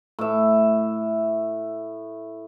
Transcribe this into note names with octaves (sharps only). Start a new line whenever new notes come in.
A2 E5